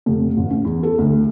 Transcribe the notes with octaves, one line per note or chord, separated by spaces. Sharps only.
F1
A1
C#4
E2
A4
D2